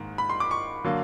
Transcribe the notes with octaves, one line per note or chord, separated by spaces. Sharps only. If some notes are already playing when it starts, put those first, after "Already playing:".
Already playing: G#2 D#3 A#3
B5
C6
D6
C#6
D3 F#3 A#3